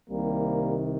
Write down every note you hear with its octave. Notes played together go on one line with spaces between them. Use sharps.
C2 C3 D#3 G3 A#3